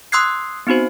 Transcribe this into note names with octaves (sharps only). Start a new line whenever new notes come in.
C6 D#6 E6 F#6 G#6 C7
B3 C4 D#4 F#4 C5